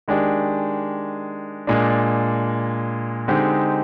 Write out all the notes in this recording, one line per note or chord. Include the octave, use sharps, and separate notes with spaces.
D#3 G#3 D4 G4
A#2 G#3 D4
D3 G#3 C4 D#4 G4